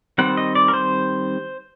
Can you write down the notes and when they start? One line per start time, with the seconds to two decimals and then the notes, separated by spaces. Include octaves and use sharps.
0.18 D#3 G3 C4 F#5
0.37 D#5
0.55 D5
0.68 A#4
0.74 C5